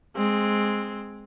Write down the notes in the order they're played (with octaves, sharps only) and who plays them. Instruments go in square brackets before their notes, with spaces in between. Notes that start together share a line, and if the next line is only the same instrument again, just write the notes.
[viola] G#3 C4